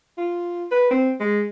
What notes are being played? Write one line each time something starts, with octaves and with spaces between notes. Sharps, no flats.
F4
B4
C4
G#3